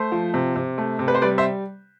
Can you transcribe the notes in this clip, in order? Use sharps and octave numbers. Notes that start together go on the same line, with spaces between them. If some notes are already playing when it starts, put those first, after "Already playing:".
Already playing: A3 C5
F3
C3
C3
A3
C3
B4
C5
G3 B4 D5
C5 E5